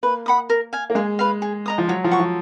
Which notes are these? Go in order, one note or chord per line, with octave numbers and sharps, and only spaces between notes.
A#3 B4
F#5 B5 D#6
A#4
F5 G#5
A#3
G#3 G#4
B4 F5
G#4
D#5 A#5 D#6
F3
F#3 C#5
F3
F#5 C#6
F3